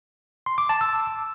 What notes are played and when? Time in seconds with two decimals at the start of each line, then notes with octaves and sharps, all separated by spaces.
0.46 C6
0.58 D6
0.69 A5
0.81 E6